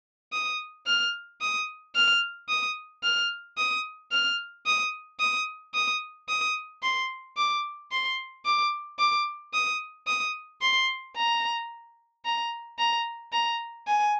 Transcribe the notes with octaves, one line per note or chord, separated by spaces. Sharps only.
D#6
F6
D#6
F6
D#6
F6
D#6
F6
D#6
D#6
D#6
D#6
C6
D6
C6
D6
D6
D#6
D#6
C6
A#5
A#5
A#5
A#5
G#5